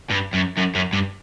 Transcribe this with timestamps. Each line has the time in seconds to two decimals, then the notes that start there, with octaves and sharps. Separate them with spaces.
0.10 G2
0.34 F#2
0.58 F#2
0.75 F#2
0.93 G2